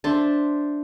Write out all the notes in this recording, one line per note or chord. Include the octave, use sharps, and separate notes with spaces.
D4 C5 E5 A5